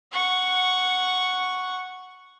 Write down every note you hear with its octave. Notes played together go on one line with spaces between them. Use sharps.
F#5 C#6